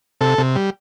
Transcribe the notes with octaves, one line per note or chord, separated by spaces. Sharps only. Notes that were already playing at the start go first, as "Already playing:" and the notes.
C3 A4
C3
G3